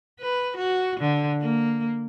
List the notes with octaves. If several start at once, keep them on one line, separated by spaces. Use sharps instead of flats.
B4
F#4
D3
A#3